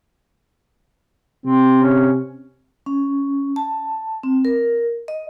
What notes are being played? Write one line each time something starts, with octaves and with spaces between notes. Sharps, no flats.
C3 C4
C#4
C#4
A5
C4
A#4
D#5